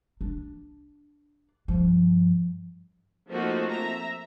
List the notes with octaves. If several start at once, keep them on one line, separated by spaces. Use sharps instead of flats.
D4
G2 F3
F3 A3 A#3 C4 D#4 F#4
E5 A#5